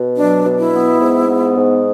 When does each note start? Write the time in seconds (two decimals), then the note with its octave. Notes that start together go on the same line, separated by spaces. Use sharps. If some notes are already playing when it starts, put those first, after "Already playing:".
Already playing: B2
0.17 F#3 D4
0.45 B2
0.60 E4
0.73 B3
1.00 G#2
1.28 B3
1.56 G#2